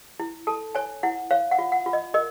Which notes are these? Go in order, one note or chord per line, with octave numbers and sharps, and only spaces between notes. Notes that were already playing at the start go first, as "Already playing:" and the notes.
E4
A4 A5
C#5 G#5
E4 F#5
C#5 F5
F#5
F4
F#5
F4
D#5
A#4 D#5